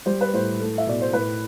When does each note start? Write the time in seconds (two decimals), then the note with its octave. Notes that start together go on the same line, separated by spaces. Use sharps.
0.06 G3 C5
0.21 B4
0.33 A2 C5
0.60 A3
0.78 E5
0.87 B2 D5
1.02 C5
1.13 A2 B4